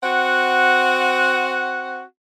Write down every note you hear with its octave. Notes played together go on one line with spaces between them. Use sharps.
C4 F#4 F#5